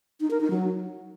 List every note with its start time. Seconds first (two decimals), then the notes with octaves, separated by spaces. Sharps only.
0.21 D#4
0.31 A#4
0.41 D#4
0.51 F#3